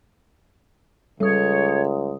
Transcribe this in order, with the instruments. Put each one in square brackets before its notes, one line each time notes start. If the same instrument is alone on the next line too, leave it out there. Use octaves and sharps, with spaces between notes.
[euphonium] C#2 [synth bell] G3 D#6 [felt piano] A4 [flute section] C#5